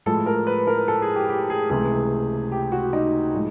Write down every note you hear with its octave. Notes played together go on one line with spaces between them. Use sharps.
A2 F3 G#3 A4
A#4
B4
A#4
A4
G#4
G4
G4
G#4
C#2 C3 E3 A3 G#4
G4
F#4
D#4
A2 F3 G#3